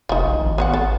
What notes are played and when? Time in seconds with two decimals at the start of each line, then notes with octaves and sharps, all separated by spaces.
0.09 F1 F3 D#4
0.25 A#1
0.41 G#1
0.58 B3 C#5 F#5
0.74 A4